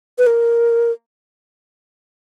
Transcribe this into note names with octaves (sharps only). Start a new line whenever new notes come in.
B4
A#4